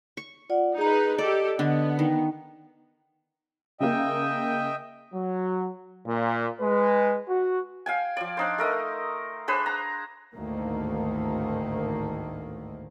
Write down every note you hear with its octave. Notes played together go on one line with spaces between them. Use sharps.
C#6
F4 D5 F#5
D#4 G#4 B4 A#5
G4 A4 D5 D#5
D3 B3
D#3
C#3 A#3 D#5 E5 G5
F#3
A#2
G#3 B4
F#4
F5 G5 G#5
F3 D5
D4 D#4 C5
A3 A#4 D#5
D4 G#4 B4 C5
A#5
G#1 D2 A2 D#3 A3 A#3